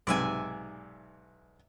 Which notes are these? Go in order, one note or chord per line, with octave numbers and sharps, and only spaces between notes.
B1 G#2 C3 D5 E5 G#5